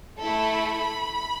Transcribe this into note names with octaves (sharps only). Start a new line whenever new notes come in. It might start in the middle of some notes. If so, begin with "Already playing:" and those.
A3 E4 A4 B5